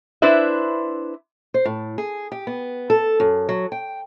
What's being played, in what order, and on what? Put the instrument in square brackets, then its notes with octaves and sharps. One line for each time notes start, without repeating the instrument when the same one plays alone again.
[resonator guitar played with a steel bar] D4 E4 B4 C5 E5
[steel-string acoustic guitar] C5
A2
G#4
G4
B3
A4
F#2
F#3
G5